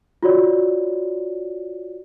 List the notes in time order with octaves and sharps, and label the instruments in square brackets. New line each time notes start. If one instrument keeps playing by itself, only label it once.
[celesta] F4 F#4 C#5 D5